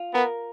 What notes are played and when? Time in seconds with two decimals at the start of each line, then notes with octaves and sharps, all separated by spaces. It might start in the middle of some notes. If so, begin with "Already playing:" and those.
Already playing: F4
0.14 B3 A#4